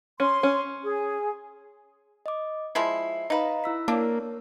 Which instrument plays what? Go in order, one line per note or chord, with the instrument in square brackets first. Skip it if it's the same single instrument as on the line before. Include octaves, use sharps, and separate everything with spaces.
[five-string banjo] C#4 [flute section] C6
[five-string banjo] C#4
[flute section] G#4
[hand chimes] D#5 D6
[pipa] F3 G#3 E4 [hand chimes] C7
[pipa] D#4 B4 [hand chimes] D#5 F5 A#5
[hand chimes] E4 E6 B6
[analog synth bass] A#3 [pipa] D4 [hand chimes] A#4 C#5